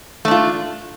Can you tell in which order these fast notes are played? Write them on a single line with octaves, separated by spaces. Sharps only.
A3 D4 F4